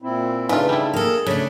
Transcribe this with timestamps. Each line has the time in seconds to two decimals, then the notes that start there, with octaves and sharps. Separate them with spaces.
0.02 A#2 C4 E4
0.49 C#3 E3 A3 D4 D#4 F4
0.69 G3 E4
0.94 A#3 G#4 A4
1.27 C#3 A3 D4